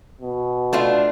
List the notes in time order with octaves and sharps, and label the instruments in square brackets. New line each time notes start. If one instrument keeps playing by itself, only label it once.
[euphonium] B2
[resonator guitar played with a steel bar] A3 D4 F4